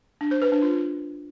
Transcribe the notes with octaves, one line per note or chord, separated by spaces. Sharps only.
D4
C5
B4
D4
F4